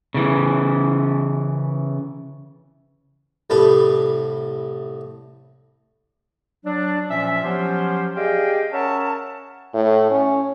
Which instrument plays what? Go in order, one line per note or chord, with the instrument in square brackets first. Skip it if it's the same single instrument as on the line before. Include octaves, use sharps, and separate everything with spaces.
[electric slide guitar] C#3 E3
[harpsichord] C2 A2 G3 A4 B4 B5
[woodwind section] F#3 D4
A#2 F3 C#4 E5
F3 F#3 B3 C#4 G4 C5
G4 G#4 D5 D#5 F5 G5
C#4 A#4 C#5 E5 F#5 A5
[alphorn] A2
C#4